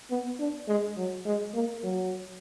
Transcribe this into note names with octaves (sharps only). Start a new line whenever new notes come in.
B3
D4
G#3
F#3
G#3
A#3
F#3